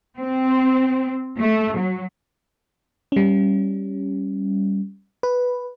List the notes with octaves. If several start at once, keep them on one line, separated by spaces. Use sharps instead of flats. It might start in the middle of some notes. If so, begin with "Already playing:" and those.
C4
A3
F#3
G3 C#4
B4